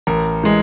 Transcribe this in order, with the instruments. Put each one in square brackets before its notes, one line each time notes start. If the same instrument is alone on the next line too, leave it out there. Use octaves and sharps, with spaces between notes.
[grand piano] A1 A#4
E3 G#3